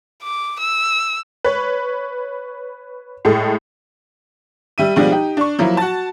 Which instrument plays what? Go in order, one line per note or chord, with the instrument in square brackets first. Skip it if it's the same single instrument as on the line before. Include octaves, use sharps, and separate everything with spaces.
[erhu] D6
E6
[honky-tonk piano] B4 C#5
A2 G#3 A4
G3 E5 D#7
B2 F3 G3 G#3 D4
D#4 G4
D4 C#6
F3 F#3 A#3 E4
F#4 A5